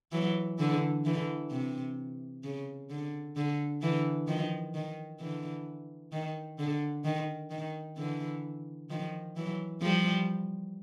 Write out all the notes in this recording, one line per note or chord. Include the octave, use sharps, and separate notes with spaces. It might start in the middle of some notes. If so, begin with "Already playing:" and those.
E3 F#3
D3 E3
D3 E3
C3
C#3
D3
D3
D3 E3
D#3 F3
D#3
D3 E3
D#3
D3
D#3
D#3
D3 E3
D#3 F3
E3 F#3
F3 G3